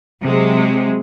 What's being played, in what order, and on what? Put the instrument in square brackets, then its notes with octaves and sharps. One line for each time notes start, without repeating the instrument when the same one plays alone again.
[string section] C3 F#3 G#3